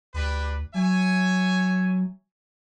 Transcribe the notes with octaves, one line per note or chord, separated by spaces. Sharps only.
D2 D4 G4 B4
F#3 C#5 E5 G#5